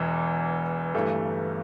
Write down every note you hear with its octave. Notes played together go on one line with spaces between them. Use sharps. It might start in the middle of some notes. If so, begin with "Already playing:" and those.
Already playing: E1 E2 E3
G1 G2 E3 A3